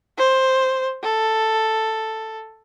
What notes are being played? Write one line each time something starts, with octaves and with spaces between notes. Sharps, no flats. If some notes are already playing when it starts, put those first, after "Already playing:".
C5
A4